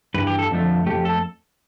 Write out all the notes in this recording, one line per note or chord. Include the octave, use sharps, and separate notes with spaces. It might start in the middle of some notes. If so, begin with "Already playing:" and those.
G2 E3 B4
G4
A4
F2 D3 F3 A3
F2 E3 A3 G4
A4